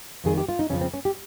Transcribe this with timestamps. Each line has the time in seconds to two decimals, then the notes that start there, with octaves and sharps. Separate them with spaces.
0.24 F2 D#3 G3 G#4
0.37 G4
0.49 F4
0.59 D#4
0.70 F2 C#3 F3 C#4
0.81 C4
0.94 C#4
1.05 G4